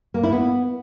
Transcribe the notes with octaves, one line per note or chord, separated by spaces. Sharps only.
A#3
E4
B3